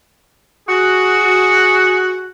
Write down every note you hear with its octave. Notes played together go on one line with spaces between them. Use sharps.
F#4 G#4